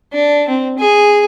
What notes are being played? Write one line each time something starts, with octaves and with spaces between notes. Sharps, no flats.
D4
C4
G#4